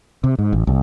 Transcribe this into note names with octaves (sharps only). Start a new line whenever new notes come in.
C3
G#2
A1
C2